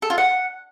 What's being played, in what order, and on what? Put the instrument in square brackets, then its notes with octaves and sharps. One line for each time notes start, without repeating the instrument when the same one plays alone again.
[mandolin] A4
F4
F#5